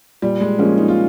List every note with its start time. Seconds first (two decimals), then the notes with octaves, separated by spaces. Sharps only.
0.22 A#2 G3
0.41 G#3
0.59 F3 G#3 A#3 C#4
0.78 D#4
0.88 F4